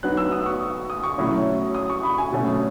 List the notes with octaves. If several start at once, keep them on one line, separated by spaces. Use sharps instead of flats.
F#3 B3 D#4 F#6
E6
D#6
C#6
D#6
C#6
B2 F#3 A3 C#4 E4
D#6
C#6
B5
G#5
B2 F#3 A3 C#4